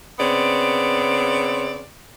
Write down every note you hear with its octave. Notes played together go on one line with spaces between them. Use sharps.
C#3 B3 C4 D5